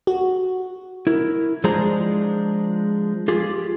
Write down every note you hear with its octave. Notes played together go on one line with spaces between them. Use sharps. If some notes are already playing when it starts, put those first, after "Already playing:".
F#4
E4 A#4
F3 G#3 D4 G#4 C5 A#5
F4 G4 G#4